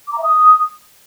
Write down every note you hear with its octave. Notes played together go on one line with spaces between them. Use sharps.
D6
A#5
E5
D#6